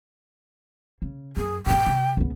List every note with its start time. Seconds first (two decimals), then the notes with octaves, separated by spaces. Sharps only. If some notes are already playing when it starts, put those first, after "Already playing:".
1.02 C#3
1.37 F#2 G#4
1.66 A1 A2 G5
1.87 C3
2.17 C#2 B3